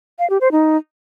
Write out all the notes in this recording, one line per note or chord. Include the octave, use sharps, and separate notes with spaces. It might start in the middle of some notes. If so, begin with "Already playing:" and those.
F5
G4
C5
D#4